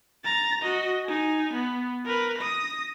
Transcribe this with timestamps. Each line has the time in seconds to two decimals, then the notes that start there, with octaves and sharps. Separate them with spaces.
0.24 A#5 A6
0.62 F#4 D#5
1.06 D#4 G#5
1.53 B3
2.05 A#4 B4
2.38 D#6 A#6